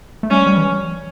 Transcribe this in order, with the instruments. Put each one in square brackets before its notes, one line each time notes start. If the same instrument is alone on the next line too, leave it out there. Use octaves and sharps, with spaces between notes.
[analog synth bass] A3
[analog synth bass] G3 [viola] C#4
[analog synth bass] G3
E3